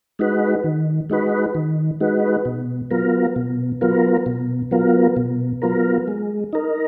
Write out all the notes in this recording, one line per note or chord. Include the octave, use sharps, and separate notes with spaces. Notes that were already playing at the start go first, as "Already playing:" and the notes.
G#3 D#4 F#4 B4
D#3
G#3 D#4 F#4 B4
D#3
G#3 D#4 F#4 B4
B2
F#3 B3 F4 A#4
B2
F#3 B3 F4 A#4
B2
F#3 B3 F4 A#4
B2
F#3 B3 F4 A#4
G#3
D#4 A#4